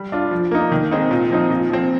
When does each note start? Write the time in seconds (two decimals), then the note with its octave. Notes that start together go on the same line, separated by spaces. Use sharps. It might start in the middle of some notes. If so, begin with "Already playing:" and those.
Already playing: G3
0.12 D4 F4
0.31 F3
0.51 A#3 D#4
0.72 D#3
0.91 G#3 C4 D#4
1.11 A#2
1.30 F3 C4 D#4
1.50 A#2
1.70 F3 C4